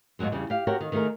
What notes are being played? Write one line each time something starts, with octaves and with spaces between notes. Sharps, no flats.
D#2 G#2 D#3 F#3 G#3
E2 C#3 G3
G4 F5
F#4 G4 A#4 C#5
D#3
D#3 A3 E4 G#4 A#4